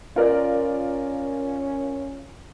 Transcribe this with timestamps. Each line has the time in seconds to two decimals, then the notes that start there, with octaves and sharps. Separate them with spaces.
0.16 C#4 F4 A#4 D5